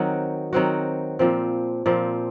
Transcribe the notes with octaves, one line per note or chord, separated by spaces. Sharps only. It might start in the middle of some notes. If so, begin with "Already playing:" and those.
Already playing: D#3 F#3 C4 F#4
D#3 F#3 C4 F#4
A#2 F3 C4
A#2 F3 C4